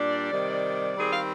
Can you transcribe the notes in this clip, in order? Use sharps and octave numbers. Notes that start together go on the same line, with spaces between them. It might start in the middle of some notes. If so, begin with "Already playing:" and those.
Already playing: A#2 G3 D4 D5
C3 D#3 G3
D#3 G3 C4 G#4
F5